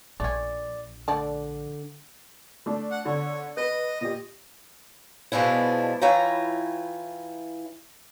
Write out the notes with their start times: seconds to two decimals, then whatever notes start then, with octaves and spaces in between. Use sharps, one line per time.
0.20 A#1 A3 C#4 D5
1.08 D3 A3 D5 A5
2.66 A3 D4
2.91 F#5
3.05 D3 C#5
3.57 B4 D#5
4.01 A#2 G4 D#5
5.32 B2 F3 G#3 D4 E4
6.01 E3 E4 F4 C#5 G5 A#5